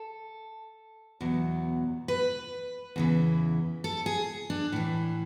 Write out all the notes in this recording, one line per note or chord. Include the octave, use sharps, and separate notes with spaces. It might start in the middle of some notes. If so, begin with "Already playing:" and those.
Already playing: A4
E2 B2 F#3
B4
E2 C#3 E3
A4
G#4
D4
A2 E3